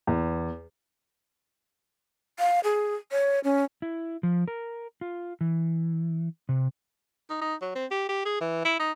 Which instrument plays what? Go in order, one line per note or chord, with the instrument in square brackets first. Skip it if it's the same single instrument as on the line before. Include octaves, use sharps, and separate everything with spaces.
[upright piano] E2
[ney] F5
G#4
C#5
C#4
[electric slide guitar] E4
F3
A#4
F4
E3
C3
[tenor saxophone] D#4
D#4
F#3
C4
G4
G4
G#4
E3
E4
D#4